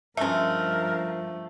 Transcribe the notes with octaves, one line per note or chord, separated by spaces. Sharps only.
G2 F3 G#3 A3 C#4 A#4 E5